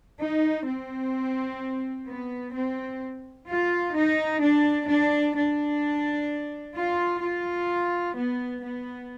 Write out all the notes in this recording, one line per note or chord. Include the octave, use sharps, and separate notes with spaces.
D#4
C4
B3
C4
F4
D#4
D4
D4
D4
F4
F4
B3
B3